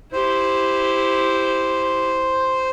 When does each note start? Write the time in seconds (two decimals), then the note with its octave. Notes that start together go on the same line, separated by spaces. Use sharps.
0.13 E4 G4 C5